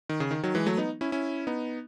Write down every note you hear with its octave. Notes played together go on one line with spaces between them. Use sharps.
D#3
C#3
D#3
D#3 F#3
E3 G#3
F#3 A3
B3 D#4
C#4 E4
C#4 E4
B3 D#4